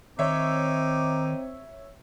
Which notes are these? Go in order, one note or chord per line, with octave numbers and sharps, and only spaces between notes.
D#3 C4 D#4 C#5 E5 D6